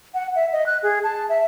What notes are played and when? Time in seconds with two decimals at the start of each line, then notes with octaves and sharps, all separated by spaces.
0.14 F#5
0.35 E5
0.52 D#5
0.66 F#6
0.83 G#4
1.03 A5
1.29 E5